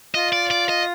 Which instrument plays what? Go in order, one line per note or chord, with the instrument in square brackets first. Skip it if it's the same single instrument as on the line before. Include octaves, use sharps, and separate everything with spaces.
[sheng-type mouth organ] F4 [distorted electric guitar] D#5
[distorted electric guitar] D5
D5
D#5